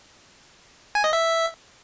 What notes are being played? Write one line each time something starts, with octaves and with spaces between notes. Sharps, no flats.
G#5
D#5
E5